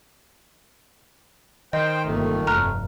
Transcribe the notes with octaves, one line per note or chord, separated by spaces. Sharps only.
D#3 C5 D#5 G5
G1 F2 C3 A3 A#3
F1 G2 A#5 F6 F#6